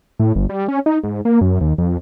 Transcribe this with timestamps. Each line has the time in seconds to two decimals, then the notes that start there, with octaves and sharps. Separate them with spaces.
0.19 A2
0.35 G1
0.49 G3
0.68 C#4
0.86 D#4
1.04 G#2
1.25 A#3
1.41 F#2
1.61 D#2
1.78 F2